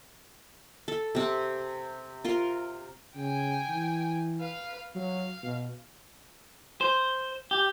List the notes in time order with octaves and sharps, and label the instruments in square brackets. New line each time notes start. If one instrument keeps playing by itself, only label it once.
[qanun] A4
C3 C4
F4 A#4 C6
[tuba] C#3 [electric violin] G5 G#5
[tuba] E3
[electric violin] B4 F5
[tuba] F#3 [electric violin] F5
[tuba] B2
[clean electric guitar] C5
G4